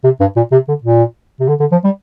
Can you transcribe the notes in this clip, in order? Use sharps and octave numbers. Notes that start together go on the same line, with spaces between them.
C3
G2
A#2
C3
D3
A#2
C3
D3
D3
F3
G3